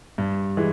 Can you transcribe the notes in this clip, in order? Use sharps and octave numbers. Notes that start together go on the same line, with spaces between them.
G2
E3 G#3